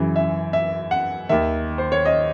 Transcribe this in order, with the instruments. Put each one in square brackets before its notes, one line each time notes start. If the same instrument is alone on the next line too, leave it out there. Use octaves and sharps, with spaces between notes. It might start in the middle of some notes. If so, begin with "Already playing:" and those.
Already playing: [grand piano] F#2 C#3 E3
E5
E5
F#5
D#2 D#3 E5
C5
C#5
D#5